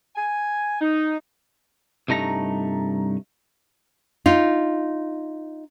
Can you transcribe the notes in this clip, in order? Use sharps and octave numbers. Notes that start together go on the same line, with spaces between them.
G#5
D#4
C2 G2 A3 D#4 A#5
D#4 F4